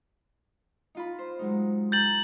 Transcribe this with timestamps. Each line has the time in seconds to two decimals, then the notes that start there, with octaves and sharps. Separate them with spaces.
0.95 D#4 F4 B5
1.19 C5
1.39 F#3 G#3 D#4
1.92 G4 A#5 G6 A6 F#7